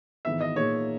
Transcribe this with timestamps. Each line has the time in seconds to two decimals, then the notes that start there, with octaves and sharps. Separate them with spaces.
0.25 G#1 G#2 E3 B3 E5
0.41 D#5
0.56 A#2 A#3 D#4 G#4 C#5